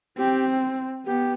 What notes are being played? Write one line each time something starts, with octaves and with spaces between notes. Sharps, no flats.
C4 G4
B3 G4